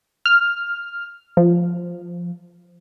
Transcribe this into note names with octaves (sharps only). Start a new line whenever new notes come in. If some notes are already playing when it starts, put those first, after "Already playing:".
F6
F3